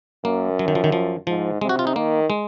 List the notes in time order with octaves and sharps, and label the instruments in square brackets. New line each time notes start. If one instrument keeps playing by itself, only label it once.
[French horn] F#2 [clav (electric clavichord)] A#3
[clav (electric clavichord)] F#3
D#3
F3
D#3
F3
[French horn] G#2 [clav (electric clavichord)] F3
[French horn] C3 [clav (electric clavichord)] G#3
[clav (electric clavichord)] F#4
F4
D#4
[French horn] D#3 [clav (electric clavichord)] A#3
[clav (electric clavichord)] G#3